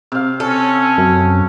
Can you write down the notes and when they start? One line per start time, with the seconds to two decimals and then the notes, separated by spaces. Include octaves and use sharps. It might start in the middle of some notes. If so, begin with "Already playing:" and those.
0.12 C3 F5
0.40 C#4 A4
0.98 F#2